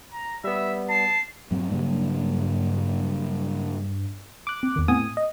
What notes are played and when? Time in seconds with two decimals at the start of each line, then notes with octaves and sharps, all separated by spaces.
0.12 A#5
0.44 G3 B3 E5
0.89 A5 C7
1.51 G2 F#3 C4
1.71 G2 C#3 F#3 A#3
4.47 D6 F#6
4.63 C4
4.76 E2 D#3
4.88 A2 B3 C4 G#5 D#6
5.17 D#5